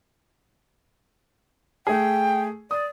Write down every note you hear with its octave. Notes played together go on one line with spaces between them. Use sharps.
A3 G#4 G5
D5 D#6